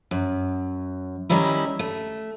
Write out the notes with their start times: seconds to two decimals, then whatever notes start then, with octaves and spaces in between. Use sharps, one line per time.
0.11 F#2
1.30 D#3 G3 C#4 D#4 E4
1.79 A3